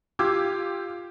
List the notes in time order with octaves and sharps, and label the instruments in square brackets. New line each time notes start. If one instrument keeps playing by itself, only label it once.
[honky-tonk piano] F4 G4 D6 E6 G#6